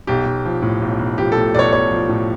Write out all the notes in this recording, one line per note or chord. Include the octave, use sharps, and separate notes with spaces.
B1 G4
B1
F3
A2
B1
B1
F3 G4
A2 A4
B1 C#5 D5
B1 C#5
F3
A2